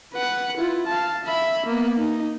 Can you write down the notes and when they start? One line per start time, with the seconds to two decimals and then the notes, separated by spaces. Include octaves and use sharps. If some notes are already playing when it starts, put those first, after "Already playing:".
0.13 B4 F#5
0.57 E4 F4
0.87 F5 A5
1.24 E5 B5
1.65 A#3 B3
1.98 D#4